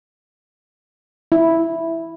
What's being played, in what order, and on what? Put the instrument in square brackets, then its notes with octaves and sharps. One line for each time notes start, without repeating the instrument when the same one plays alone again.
[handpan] E4